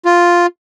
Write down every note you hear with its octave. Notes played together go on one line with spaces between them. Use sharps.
F4